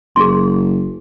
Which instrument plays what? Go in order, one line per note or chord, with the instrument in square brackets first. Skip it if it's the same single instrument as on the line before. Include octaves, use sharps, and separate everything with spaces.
[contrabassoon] F#1 [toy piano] G#4 C6